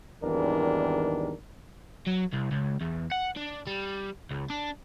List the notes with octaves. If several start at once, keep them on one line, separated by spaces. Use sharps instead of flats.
G#1 E2 D#3 G3 D4 A#4
F#3
C2
C#2
E2
F#5
D4
G3
C#2
D4